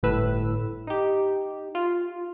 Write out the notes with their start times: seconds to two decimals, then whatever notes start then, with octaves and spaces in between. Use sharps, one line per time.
0.03 G1 A2 B4 E6
0.87 D#4 G4
1.75 F4